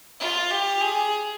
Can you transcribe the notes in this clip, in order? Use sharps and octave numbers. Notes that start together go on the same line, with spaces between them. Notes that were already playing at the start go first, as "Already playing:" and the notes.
F4
G4
G#4